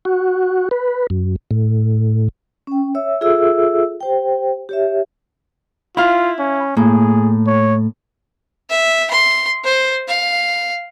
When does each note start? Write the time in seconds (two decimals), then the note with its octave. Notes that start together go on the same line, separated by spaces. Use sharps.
0.05 F#4
0.71 B4
1.10 F#2
1.51 A2
2.67 C#4 G5
2.95 C#5 E5 E6
3.21 F4 G#4 A4 E5 E6
4.01 G4 C5 G5
4.69 G4 C#5 E5
5.97 E4 F4 F5
6.39 C#4
6.77 A2 A#3 G#4
7.47 C#5
8.70 E5
9.11 C6
9.64 C5
10.08 F5